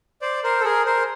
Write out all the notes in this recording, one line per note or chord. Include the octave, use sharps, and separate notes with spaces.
C5 D5
A#4 C5
A4
G#4 A#4
A#4 C5